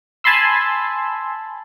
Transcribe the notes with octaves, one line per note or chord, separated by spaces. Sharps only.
G#5 A5 B5 C6 E6